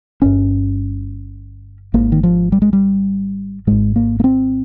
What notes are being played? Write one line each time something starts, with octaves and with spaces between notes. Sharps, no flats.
G1 G2 C#4
G#1 G#2 A#3
D#3
F3
G3
G#3
G3
G#1 G#2 G#3
A#3
A#3
C4